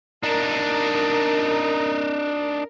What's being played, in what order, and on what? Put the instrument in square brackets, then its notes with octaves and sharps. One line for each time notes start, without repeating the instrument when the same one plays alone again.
[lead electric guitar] D4 D#4 [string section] A#4